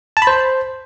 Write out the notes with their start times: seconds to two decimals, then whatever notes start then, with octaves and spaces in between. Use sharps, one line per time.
0.17 A5
0.22 B5
0.27 C5